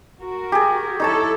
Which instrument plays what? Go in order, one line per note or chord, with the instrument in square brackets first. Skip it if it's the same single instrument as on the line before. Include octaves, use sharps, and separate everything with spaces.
[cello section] F#4 A#4
[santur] G4 G#4
[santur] D#4 C#5 A5 [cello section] E4 A4